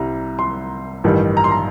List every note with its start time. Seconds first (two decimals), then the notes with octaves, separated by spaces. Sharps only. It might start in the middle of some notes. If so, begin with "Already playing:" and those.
Already playing: C2 C3 G3 A#5
0.39 C6
1.04 A1 G2 D#3 G3
1.37 A#5
1.44 C6
1.51 A#5